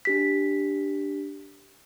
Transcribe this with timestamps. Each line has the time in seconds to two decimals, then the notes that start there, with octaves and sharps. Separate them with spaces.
0.05 D4 G4 B6